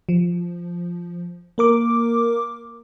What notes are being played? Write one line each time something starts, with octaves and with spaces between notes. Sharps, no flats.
F3
A#3 A#4 D6